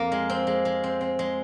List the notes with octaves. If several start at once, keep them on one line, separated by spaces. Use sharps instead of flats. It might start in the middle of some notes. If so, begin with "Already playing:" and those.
Already playing: F2 A#3 F4
G#3
C4
G#3
G#3
C4
C4
G#3